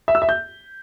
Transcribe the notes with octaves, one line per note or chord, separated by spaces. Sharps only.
E5
E6
E5
G6